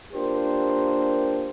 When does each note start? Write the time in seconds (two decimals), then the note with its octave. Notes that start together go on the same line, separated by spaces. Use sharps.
0.13 A#3 D4 F4 G4 A#4 C5